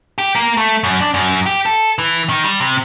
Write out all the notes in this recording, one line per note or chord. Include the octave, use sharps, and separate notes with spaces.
G4
A#3
A3
F#2
D4
F#2
G4
A4
E3
D#3
G3
C3